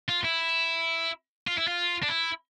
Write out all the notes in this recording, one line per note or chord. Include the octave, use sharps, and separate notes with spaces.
F4
E4
F4
E4
F4
D4
E4